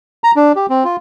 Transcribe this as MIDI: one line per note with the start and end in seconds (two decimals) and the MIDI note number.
0.24 0.31 82
0.36 0.52 62
0.56 0.66 67
0.70 0.84 60
0.84 0.96 65